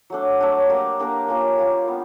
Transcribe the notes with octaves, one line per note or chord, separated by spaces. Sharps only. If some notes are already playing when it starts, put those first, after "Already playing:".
F#3 A3 D4
F#3 A3 D4
A#3 D4 G4 A#4
A#3 D4 G4 A#4
A#3 C#4 F4 A#4
A#3 C#4 F4 A#4
G3 B3 D4 G4